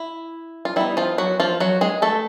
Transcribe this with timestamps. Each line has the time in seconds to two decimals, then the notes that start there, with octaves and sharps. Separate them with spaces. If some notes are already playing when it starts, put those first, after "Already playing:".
Already playing: E4
0.65 F4
0.76 G3 B3 D#4 E4
0.97 F3 F4
1.18 F#3 F#4
1.40 F3 F4
1.60 F#3 F#4
1.81 G#3 G#4
2.02 A3 A4